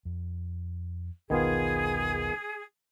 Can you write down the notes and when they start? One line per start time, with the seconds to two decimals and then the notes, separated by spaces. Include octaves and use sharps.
0.05 F2
1.30 E1 B1 D#3 B3 F4 G#4